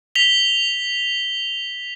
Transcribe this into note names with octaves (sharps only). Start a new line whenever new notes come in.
B6 F7 G7